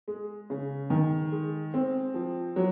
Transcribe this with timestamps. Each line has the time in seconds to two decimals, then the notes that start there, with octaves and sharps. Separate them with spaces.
0.08 G#3
0.50 C#3
0.90 D#3
1.32 G#3
1.74 C4
2.14 F3
2.56 F#3